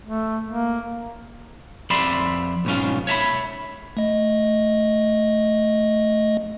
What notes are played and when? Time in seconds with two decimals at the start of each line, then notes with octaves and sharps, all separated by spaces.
0.06 A3
0.48 A#3
1.90 F2 D5 E5 B5 C6
2.65 B1 G#2 C#4 F4
3.07 C#5 E5 A5 B5
3.97 A3 D#5